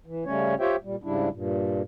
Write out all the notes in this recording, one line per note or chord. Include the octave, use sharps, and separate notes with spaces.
E3
C#3 G3 A3 C#4 C#5
F4 G4 C5 C#5 E5 G5
A#2 G3
G#2 C#3 G3 D4 E4
G2 A#2